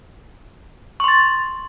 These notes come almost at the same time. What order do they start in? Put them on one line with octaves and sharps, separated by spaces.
C#6 C6 A6